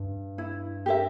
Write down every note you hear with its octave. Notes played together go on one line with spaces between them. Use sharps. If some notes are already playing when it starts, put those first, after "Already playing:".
Already playing: G2
E4
G4 A#4 E5